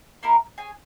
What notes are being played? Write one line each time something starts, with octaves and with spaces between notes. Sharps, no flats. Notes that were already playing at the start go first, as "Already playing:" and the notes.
A#3 E4 A#4
G#4 C#5 G#5